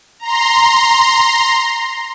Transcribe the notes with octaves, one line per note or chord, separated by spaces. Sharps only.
A#5 C6